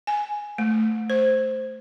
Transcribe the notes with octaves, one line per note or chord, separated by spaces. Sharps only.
G#5
A3
C5